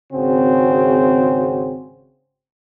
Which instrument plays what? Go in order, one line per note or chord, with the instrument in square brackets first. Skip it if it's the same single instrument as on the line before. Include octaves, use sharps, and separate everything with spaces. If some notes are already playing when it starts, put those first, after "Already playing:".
[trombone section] G#1 C#3 C4 F#4 G#4